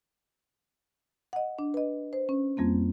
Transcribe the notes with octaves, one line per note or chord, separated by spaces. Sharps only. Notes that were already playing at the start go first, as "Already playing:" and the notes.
D#5 F#5
D4
B4 D#5
C5
C#4
F2 G3 A#3 C4